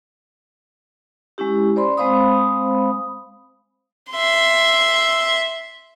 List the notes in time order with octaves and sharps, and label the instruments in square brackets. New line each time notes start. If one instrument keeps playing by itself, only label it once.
[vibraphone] G#3 C#4 E4 G4
C5 D5 B5 C6
G#3 C4 C5 F5 B5 D#6
[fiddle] E5 C6